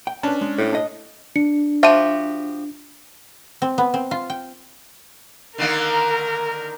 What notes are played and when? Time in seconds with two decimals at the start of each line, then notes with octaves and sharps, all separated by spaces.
0.07 G5
0.23 C#4 D4 B4 A5
0.41 G#3
0.58 A2
0.72 D4 D#5
1.36 D4 C#7
1.83 F3 F#4 G4 E5 D#7
3.62 C4
3.78 B3
3.94 C4
4.11 F4
4.30 G5
5.58 D3 D#3 A#3 A#4